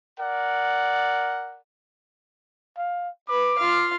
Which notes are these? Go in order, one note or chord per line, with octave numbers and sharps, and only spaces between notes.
A#4 D5 F#5
F5
B4 D6
F4 F5